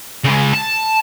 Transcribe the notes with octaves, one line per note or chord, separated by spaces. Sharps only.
C#3 G#3
A5